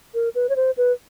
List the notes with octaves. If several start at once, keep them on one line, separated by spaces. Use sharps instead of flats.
A#4
B4
C#5
C5
B4